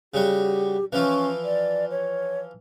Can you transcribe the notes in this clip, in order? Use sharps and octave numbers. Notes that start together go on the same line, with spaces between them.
C#3 G3 F#4 G4
E3 F3 C#4 F4
D5
C#5